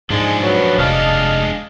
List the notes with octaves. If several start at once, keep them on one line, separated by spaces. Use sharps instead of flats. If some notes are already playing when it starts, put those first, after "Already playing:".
G#2 F3 G#3 D4
F#2 F#3 B4
F1 G#3 D4 D#5 F5 A5